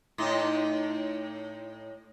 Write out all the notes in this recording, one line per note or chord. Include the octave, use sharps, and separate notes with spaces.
A2 D#4